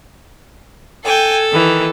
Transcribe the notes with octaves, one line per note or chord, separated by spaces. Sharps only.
A4 G5 G#5
D#3 E3